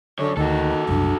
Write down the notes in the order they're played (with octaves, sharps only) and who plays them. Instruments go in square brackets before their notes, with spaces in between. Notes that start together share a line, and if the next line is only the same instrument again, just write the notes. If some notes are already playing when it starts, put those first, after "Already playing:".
[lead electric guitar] F#2 C#5 [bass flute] D3
[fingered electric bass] D2 [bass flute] D#3 [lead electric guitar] F#4 A4
[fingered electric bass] F#1 C2 F#2 [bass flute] D4